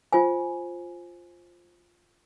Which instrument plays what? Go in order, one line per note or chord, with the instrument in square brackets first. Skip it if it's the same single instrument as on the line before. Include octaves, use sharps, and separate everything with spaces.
[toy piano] F4 C5 G#5